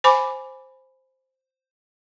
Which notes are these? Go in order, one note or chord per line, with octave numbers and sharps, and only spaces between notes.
C5 G#5 B5 D6